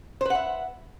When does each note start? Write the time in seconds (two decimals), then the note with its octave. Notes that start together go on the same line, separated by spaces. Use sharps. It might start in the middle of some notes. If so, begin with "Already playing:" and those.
0.21 C5
0.25 B4
0.30 F#5
0.35 E5